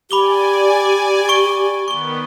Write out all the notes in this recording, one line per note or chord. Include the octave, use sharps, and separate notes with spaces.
G4 D5 G#5 B5 D6 G7
C#6 D7 G7
D#3 B3 C#6 G7